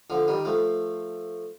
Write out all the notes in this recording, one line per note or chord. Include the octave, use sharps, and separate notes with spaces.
D3 F3
D#3 G3
F3 A3